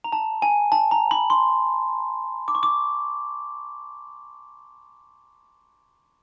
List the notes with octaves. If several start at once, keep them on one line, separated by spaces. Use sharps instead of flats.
A#5
A5
G#5
A5
A#5
B5
C6
D6
C#6
D6